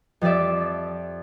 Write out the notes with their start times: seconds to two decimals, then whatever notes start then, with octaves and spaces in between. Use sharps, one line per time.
0.21 F2 F3 G4 D5 E5